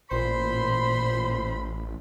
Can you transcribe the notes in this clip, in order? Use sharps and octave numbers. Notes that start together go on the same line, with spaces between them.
A1 A#2 C5 B5 C6